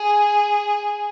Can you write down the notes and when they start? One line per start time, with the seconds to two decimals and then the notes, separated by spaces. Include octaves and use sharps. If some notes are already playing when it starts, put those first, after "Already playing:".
Already playing: G#4